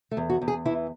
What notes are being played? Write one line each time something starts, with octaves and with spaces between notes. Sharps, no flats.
A3
E2
F#4
E2
G#4
E3 E4